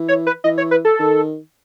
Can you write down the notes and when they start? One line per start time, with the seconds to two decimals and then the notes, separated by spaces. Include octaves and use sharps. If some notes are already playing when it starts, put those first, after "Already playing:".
Already playing: E3
0.08 C#5
0.27 B4
0.44 E3 D#5
0.58 C#5
0.71 B4
0.85 A4
0.99 D#3